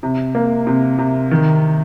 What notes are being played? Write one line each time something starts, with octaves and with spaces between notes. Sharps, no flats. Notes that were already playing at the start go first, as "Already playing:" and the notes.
C3
A#3
C3
C3
D#3